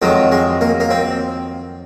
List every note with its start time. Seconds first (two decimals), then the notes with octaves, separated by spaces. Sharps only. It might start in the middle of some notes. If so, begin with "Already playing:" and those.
0.02 F2 D#3 F#3 G#3
0.32 G#3
0.61 A#3
0.80 A#3
0.90 C4